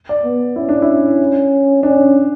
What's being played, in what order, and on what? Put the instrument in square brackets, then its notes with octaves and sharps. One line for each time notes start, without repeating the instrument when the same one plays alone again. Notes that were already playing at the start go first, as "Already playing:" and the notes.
[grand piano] D5
[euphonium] B3
[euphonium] C#4 [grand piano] E4
[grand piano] D4
E4
[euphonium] C#4 [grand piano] D4